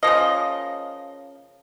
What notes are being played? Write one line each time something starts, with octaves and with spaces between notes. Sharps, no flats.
C#3 F3 A#3 D#5